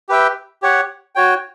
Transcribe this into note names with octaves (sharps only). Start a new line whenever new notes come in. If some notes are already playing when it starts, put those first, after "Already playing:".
G4 B4 E5 G5
G4 C#5 F#5
F#4 C#5 G5